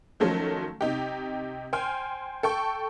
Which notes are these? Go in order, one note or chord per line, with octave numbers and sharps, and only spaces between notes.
D#3 F3 F#3 A3 C#4
C3 D#4 G4
C5 G5 G#5 F6
A4 G5 C#6